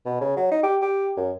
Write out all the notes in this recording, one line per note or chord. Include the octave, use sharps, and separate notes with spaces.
B2
C#3
F#3
D#4
G4
G4
F#2